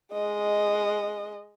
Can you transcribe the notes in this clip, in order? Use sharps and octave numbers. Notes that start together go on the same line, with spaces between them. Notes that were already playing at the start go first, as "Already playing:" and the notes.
G#3 D#5